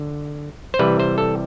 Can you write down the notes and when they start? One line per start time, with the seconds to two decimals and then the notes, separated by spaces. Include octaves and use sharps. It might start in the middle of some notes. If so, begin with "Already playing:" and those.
Already playing: D3
0.74 C5
0.79 C3 E3 G3 B4
0.99 C5
1.18 A4